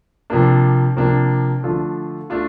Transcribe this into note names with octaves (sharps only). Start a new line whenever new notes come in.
C3 F3 A#3 D4
C3 F3 A#3 D4
D3 F3 A3 D4 F4
A3 D4 F4